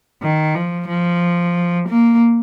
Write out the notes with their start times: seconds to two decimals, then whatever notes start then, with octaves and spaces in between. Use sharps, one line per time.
0.22 D#3
0.55 F3
0.89 F3
1.89 A#3